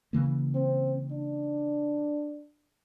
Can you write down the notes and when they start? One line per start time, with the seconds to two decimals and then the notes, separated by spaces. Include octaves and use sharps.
0.13 C#3 E3 A#3
0.55 C4
1.11 D4